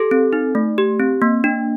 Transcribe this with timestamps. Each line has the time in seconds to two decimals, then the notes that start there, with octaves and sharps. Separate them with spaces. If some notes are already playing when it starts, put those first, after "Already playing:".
Already playing: G4 A4
0.11 C4
0.33 D#4
0.55 A3
0.78 G4
0.99 C4
1.22 A#3
1.44 D4